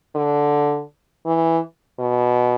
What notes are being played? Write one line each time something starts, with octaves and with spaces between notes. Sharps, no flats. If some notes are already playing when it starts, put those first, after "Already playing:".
D3
E3
B2